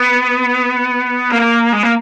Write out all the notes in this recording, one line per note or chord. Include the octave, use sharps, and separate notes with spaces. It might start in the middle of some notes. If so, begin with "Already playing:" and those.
Already playing: B3
A#3
G#3
A#3